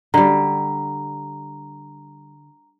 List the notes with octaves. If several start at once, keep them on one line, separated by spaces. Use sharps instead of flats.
D3 G3 A#5